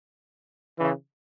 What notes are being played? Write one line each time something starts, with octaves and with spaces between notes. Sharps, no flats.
C#3 E3